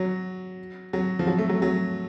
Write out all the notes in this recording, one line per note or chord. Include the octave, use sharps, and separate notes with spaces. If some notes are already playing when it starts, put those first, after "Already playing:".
Already playing: F#3
F#3
F3
F#3
A3
F#3
F#3